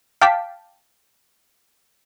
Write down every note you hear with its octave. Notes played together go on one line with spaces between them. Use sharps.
F5 G5 A5 D6 B6